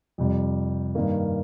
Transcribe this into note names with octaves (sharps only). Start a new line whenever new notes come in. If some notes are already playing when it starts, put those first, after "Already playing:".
F2 C3 G3
G2 D#3 A#3